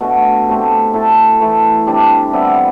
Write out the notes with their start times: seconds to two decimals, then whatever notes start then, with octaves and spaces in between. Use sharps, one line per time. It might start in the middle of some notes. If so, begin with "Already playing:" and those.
0.01 B2 A3 D4 F#4
0.47 A3 C4 G4
0.94 A3 E4 A4
1.40 E3 A3 E4
1.87 C3 G3 D4 G4
2.33 C3 G3 B3 E4